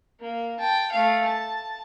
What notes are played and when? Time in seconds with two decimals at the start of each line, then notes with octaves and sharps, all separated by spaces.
0.20 A#3
0.59 G5 A5
0.92 A3 F5
1.25 A5